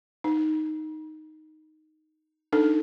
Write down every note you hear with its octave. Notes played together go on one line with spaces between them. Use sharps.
D#4
D4 D#4 A4